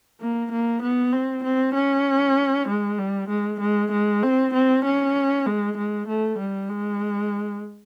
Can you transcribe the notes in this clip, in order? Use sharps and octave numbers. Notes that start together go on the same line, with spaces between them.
A#3
A#3
B3
C4
C4
C#4
G#3
G3
G#3
G#3
G#3
C4
C4
C#4
G#3
G#3
A3
G3
G#3